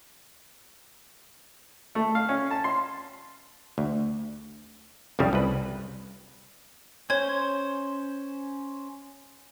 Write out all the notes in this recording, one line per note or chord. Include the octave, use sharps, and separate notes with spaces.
A3
F5
C#4
A5
C6
D2
C2 F2 C#3 G3
C2 B4
C#4 C5 C#5 G#6